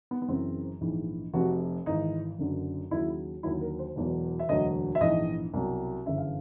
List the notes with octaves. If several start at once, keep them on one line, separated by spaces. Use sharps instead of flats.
B3
B3
F#1 F#2 C#3 E3 C4
A#1 G#2 E3
F1 F2 C3 F#4
G#1 G#2 E3 D#4
F#1 F#2 D3 F#3
D#2 C#3 F#3 E4
D#2 D3 F#3 E4
A#4
C5
E1 E2 B2 F#3
E5
E1 D2 D3 F#3 D#5
E5
A#1 G#2 E3 D#5
C2 B2 F#3
G1 F#2 C#3 E3 E5
F5